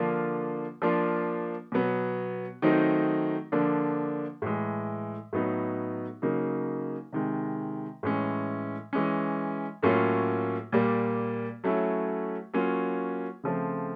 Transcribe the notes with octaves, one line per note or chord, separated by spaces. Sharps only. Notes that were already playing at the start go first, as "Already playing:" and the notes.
Already playing: D3 F3 A#3 D4 F4
F3 A#3 D4 F4
B2 F#3 B3
D#3 F#3 A3 C4 D#4
D3 F3 A#3 D4
A2 E3 G#3
A2 F#3 B3 D#4
C#3 F#3 A#3 D#4
C3 D#3 G#3
A2 E3 G#3 C#4
E3 G#3 C#4
A2 F#3 A#3 C#4 F4
A#2 G3 A#3
F#3 A3 C#4 E4
F#3 A#3 C#4 F4
C#3 F3 A3 C4